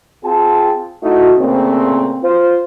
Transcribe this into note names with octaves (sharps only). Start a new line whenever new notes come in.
C4 F4 G#4 G5 A5
A3 D#4 E4 F#4
A#2 C#3 A3 A#3 C4
F4 C5